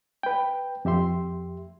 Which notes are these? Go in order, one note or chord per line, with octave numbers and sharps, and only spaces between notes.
B4 G5
F2 G4 E5 C6